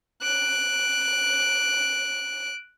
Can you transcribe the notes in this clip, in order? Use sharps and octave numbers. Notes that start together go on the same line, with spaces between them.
F#6 D7